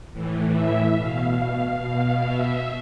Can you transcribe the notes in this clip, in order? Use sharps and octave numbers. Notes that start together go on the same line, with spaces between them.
A2 E3
E5
B2 F5
B2
E5